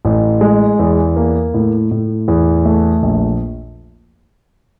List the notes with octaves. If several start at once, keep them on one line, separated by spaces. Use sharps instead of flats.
A1
G#3
E2
A#3
A2
A2
E2
A3
A#1